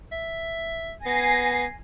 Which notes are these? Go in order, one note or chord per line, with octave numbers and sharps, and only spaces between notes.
E5
B3 G#5 A#6 C7